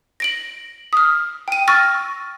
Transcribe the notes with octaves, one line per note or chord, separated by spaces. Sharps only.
A#6 D7 F#7
D#6 F6
G5 D#7
C#6 E6 F6 A6 A#6